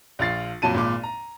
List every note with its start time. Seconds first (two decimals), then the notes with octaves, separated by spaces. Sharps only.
0.19 A#1 F4 A6 C7
0.62 F2 A#2 F#3 A5 D#7
0.75 G#1 A#2 D6
1.03 A#5